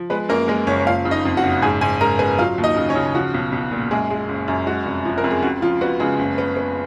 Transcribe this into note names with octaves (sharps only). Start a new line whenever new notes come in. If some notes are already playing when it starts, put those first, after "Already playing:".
Already playing: F3
G#3 B3 B4
F#2 A#3 A#4
G#3 A#3 A#4
F#1 C#4 C#5
F#1 F4 F5
C#3
D#4 D#5
F2
F#4 F#5
F#1
G#2 G#4 G#5
G#2 G#4 G#5
G#2 A#4 A#5
B3 G#4 G#5
F#3 F4 F5
D#2
D#4 D#5
C#3
C#4 C#5
C#3
F3 F#4
B1
B1
A#2
F#2 G#3 G#4
G#3
F#1
F#2
G#3 F#4
F1
F3
A#4
F2
G#4
C#2 F#4
F3 F4
B3 F#4
C#3 G#3 G#4
F#1
B3
B3